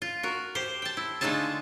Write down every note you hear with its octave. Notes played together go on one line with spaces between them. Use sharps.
F4
F#4 A#4
G4 C5
G5 A5
E4
D3 G#3 A3 D#4 F4 A5